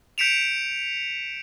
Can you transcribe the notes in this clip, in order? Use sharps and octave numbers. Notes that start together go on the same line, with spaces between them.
G6 B6 C#7 D7 E7 F7